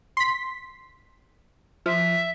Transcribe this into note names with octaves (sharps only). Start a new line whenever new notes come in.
C6 B6
F3 E5